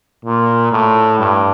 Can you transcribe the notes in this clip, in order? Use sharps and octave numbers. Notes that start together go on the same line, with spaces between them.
A#2
A2
G2